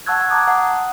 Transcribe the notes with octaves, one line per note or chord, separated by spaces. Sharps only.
F#5 A5 C#6 E6 F#6 G#6
A5 A#5 D6 D#6
F#5 A5